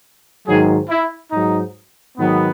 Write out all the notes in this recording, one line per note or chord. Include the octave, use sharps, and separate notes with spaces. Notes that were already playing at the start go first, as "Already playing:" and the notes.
G#2 D#3 F#3 G#4
E4
G#2 F#3 D#4
G#2 D#3 F#3 B3